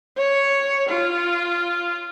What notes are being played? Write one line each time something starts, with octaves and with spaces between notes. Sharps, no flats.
C#5
F4